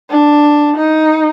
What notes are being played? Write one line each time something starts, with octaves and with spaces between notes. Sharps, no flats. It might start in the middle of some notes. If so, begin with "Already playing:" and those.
D4
D#4